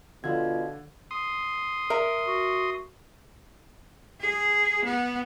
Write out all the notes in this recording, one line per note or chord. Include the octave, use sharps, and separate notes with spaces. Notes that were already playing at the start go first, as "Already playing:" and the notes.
B2 D3 F4 D5 F5 G#6
C6 D#6
A#4 E5 A#5
F#4
G#4
B3